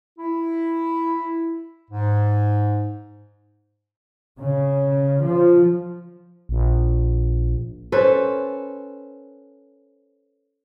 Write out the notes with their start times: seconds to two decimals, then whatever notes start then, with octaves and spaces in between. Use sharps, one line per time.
0.18 E4
1.90 G#2
4.39 C#3
5.23 F3
6.49 A#1
7.92 C#4 A4 B4 C5